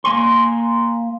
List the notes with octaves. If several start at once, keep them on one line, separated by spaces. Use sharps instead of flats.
A#3 G#5 C6